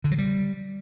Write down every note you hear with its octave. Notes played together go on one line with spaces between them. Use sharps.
D3
F#3
G3